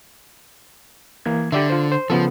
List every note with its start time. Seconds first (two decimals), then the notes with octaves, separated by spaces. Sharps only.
1.26 E3 A#3 G#6
1.52 D3 G4 D5 E5
1.70 F4 C5
1.92 C5
2.10 C#3 F3 B3 A4